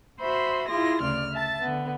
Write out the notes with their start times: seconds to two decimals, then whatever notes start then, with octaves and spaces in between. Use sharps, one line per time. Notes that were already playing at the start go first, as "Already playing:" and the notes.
0.20 F#4 C5 E5 B5 C6
0.68 E4 F4 G#4 C6 A#6
1.01 D2 C#3 D5 F6
1.33 E5 A5 A6
1.62 D3 B3